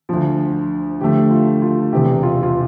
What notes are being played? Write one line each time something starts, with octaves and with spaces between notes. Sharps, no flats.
D2 D3 F3
D2 D3 F3 A3 G4
F4
F4
E1 E2 C3 G4
F4
F4